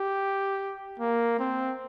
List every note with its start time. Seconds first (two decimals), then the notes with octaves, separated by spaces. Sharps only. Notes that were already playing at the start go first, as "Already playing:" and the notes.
Already playing: G4
0.99 A#3
1.39 C4